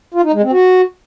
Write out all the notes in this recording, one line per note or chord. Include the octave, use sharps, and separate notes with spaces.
F4
D#4
G#3
C4
F#4